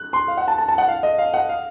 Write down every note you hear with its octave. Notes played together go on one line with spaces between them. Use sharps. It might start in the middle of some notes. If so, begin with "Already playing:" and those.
Already playing: F#6
C6
F5
F#5
A5
A5
A5
F#5
F5
D#5
F5
F#5
F5